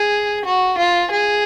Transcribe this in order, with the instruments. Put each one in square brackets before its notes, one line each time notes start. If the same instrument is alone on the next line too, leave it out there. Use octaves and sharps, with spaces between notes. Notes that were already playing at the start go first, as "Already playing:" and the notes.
Already playing: [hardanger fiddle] G#4
F#4
F4
G#4